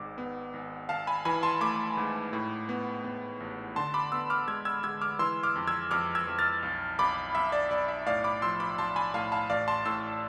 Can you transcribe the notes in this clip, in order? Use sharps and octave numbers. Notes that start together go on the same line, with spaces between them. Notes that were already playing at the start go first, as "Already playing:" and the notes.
Already playing: G#1 G#2 D6
B3
G#1
G#1 F5 A5
G#5 B5
E3 G#5 B5
A5 C6
A3 B5 D6
G#2
A2
B3
B3
A1
D3 A5 C6
B5 D6
B3 C6 E6
D6 F6
G#3 E6 G#6
E6 G#6
G#3 E6 G#6
D6 F6
E3 C6 E6
D6 F6
F2
E6 G#6
F2 D6 F6
E6 G#6
F2
F6 A6
B1
B1 B5 D6
B1 E5
D5
B1 D5
E5
A2 D5 F5
B5 D6
F3 C6 E6
B5 D6
B1 A5 C6
G#5 B5
A2 F5 A5
F5 A5
A1 D5 F5
A5 C6
A2 C6 E6